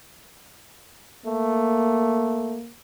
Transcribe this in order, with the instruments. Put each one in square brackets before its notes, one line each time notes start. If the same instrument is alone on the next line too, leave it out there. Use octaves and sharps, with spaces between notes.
[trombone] A3 [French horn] A#3